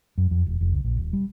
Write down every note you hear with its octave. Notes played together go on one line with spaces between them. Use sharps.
F#2
F2
E1
F1
C#2
A#1
D#1
G3